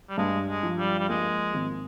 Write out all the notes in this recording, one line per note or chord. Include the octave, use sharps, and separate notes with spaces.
G3
G2 G#3
G#3
F3
G3
G3
G#3 A#3
G#1